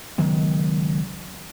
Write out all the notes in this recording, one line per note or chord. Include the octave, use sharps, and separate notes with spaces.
C#2 D#3 F#3 B3